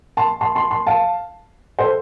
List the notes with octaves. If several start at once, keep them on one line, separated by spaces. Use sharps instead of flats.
A5 C6
A5 C6
A5 C6
A5 C6
F5 A5
A4 C5